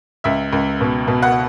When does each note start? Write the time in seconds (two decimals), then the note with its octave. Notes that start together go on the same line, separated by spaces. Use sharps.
0.24 C#2 E5
0.53 C#2
0.81 B2
1.08 B2
1.22 F#5